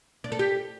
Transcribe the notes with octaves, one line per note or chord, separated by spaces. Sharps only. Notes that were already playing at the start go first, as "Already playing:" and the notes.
D4
A4
G4